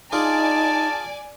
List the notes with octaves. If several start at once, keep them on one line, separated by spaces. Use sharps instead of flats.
D4 D#4 F4 G#4 D5 G#5 A5 D6